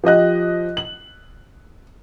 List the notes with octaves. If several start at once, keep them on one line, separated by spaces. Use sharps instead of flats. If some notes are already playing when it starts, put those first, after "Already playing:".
F3 G4 D#5 F#6
F#7